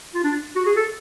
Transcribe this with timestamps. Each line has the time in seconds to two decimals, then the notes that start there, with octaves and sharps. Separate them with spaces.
0.15 F4
0.24 D4
0.56 F#4
0.66 G#4
0.76 A4